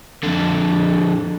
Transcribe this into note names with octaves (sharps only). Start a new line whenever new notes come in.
F2 D3